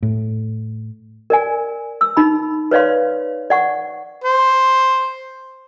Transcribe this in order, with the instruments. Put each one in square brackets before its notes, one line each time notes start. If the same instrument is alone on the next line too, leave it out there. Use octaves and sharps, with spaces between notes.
[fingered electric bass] A2
[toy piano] A#4 D5 G#5
E6
D#4 B5
B4 C#5 D5 F5 C6
D5 F#5 C#6
[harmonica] C5